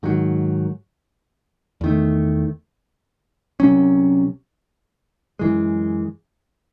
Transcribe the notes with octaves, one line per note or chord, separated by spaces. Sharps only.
G#2 D#3 F#3
E2 D#3 A3
C2 C3 F#3 C#4
F#2 E3 G#3